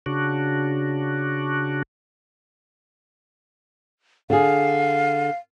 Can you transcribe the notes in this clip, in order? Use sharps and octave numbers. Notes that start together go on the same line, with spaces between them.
C#3 D4 F#4
D3 G#4 F5